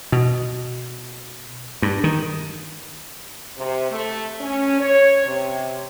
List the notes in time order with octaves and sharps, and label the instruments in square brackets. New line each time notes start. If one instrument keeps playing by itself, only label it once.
[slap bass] B2
G2
D#3
[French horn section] C3
A3
C#4
C#5
C3